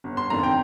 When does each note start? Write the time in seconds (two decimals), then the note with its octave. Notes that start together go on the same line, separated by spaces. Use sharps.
0.04 G1
0.17 C6
0.30 F2 D#3 A#3 D4 A#5
0.43 G5